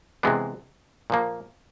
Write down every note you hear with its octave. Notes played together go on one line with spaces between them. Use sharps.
C3 E3 G#3 B3 D4
A#2 F3 A#3